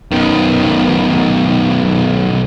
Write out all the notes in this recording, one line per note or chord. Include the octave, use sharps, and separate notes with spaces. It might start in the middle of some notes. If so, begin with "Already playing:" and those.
B1 D#3